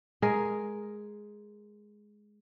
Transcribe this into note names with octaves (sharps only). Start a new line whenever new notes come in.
G#3 G#4 A#4